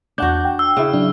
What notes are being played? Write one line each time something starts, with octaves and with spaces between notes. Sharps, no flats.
E2 D4 F#4 F#5 G6
G5
E6
C#3 E4
F#3 D4